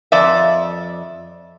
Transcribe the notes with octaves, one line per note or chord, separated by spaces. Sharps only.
F2 D5 E5